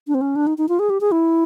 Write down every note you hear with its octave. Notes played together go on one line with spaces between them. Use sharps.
D4
C4
C#4
D4
D#4
D#4
F4
G#4
G4
G#4
E4